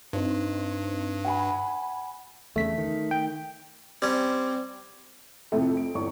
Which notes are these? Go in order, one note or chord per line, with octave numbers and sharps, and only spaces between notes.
G2 C4 D#4 C5
F#5 G#5 B5
E2 C#3 A3 B6
D#3
G5
G3 C4 C#4
F2 A2 C3 F3 A3 C4
F2 D7
G1 E2 C#6